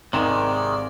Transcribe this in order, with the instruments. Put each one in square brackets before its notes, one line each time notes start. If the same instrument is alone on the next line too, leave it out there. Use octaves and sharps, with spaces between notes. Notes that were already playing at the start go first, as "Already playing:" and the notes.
[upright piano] G#1 E7 [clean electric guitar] C3 D#3 G#3 [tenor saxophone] D5